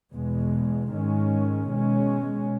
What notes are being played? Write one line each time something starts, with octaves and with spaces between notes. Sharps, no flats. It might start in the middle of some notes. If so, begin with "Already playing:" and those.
E2 B2 G#3
G#2 D#3 G#3 C#4
B2 G#3 C#4